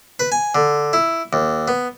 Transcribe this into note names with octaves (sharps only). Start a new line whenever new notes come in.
B4
G#5
D3
E4
D#2
B3